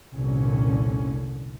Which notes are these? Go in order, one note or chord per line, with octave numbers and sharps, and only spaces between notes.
F1 C2 A#2 D3 C#4